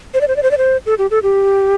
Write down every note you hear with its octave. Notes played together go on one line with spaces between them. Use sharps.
C5
D5
C5
D5
C5
D5
C5
A4
G4
A4
G4